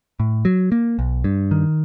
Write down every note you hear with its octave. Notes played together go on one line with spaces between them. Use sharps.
A2
F#3
A#3
B1
G2
D#3